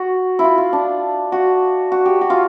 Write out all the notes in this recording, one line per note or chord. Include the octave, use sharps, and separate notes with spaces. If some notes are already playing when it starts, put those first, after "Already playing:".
Already playing: F#4
E4
F4
F4
D4
F#4
F#4
G4
F#4
F4